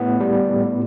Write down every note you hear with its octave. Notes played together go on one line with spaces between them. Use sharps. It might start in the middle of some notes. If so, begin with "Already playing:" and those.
Already playing: A2 B3
G3
A2